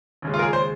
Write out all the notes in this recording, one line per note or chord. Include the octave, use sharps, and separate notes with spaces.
D#2 C#3 G#3
F4
A#4
G#4
C5